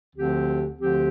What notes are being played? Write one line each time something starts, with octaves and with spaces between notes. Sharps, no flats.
D2 D3 F3 C4 G4
D2 D3 F3 C4 G4